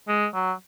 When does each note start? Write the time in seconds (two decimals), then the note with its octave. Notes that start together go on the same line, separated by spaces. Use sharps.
0.08 G#3
0.34 F#3